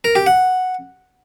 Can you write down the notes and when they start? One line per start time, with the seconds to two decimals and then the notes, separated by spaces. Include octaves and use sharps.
0.04 A#4
0.15 G4
0.26 F#5